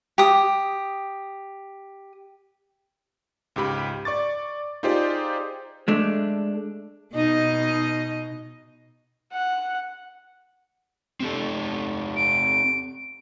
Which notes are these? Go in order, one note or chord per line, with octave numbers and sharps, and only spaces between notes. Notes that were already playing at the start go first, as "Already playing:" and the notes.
G4 D#6
C#2 G#2 G4 B5
D5 C#6 D6 A6
D#4 F4 G4 G#4 C5 D5
G#3 A3 D4
B2 D#4 D#5
F#5
C4 G4 A4
D7